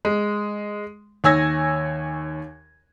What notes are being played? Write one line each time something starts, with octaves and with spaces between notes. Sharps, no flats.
G#3
D#2 C#5 G#5 E6 G#6 A#6